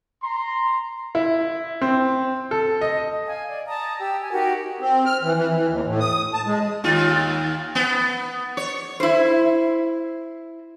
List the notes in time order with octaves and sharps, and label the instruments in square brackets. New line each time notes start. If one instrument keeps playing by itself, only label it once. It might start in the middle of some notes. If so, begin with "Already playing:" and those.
[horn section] A#5 C6
[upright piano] E4
C4
A4
D#5
[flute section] F5 G#5
D5
A5 A#5 D#6
G4 E6
G#5
D#4 F#4 G4 A#4
[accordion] C4
F6
E3
E3
E3
D#2
A2
D#6
A5
G#3
[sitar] D#2 F4
B3
C#5
[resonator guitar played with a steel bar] E4 C5